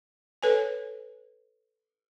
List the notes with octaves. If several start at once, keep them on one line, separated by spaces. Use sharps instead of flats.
A4 B4 C#5 G#5